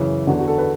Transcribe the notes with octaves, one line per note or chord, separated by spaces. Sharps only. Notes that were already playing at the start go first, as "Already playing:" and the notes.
Already playing: F#2 C#3 E3
E2 D3 F#4
F#4
A4
B4